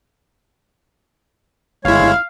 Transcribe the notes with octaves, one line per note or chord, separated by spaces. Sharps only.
G1 G#3 E4 C#5 F5